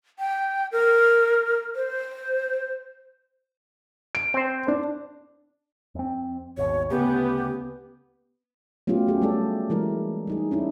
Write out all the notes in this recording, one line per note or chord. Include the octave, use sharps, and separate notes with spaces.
G5
A#4
C5
D7
C4 C5
D4
F2 C4
G#1 D#2 B2 C#5
D2 C#3 B3 G4
F#3 A3 B3 C#4 F4 G4
C#4 G4 G#4
G3 A3 D4 A4 D5
E3 G3 G#3 E4 A#4
G3 D#4 G#4
C#4 D4 E4